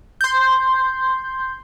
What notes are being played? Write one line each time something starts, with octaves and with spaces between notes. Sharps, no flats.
C6 G6